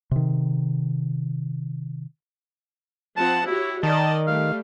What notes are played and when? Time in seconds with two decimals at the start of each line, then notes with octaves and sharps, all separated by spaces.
0.11 C3 D#3
3.17 F3 C4 F#5 A5
3.47 E4 F#4 G4 C#5
3.83 D#3 A#4 D5 D#5 A5
4.27 G3 A3 F5